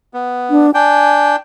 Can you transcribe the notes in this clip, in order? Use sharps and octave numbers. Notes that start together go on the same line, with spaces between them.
B3
D4
D4 G5 G#5